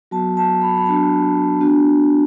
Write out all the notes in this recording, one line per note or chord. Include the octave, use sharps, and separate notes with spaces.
F#3 B3 F#4 A5
A5
B5
B5
F#3 B3 D4 F#4 A5
B3 D4 F#4